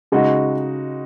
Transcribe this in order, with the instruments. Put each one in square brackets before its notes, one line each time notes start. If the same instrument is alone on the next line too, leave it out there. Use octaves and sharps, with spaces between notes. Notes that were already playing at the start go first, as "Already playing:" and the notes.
[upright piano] C#3 G#3 D#4 F#4